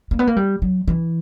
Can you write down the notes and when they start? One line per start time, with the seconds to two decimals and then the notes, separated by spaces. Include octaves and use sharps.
0.11 A#3
0.19 B3
0.27 A#3
0.37 G3
0.62 F#3
0.88 E3